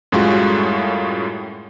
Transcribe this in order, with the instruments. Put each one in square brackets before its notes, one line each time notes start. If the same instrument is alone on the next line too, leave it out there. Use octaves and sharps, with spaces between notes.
[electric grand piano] F#2 A2 G3 G#3 F4 F#4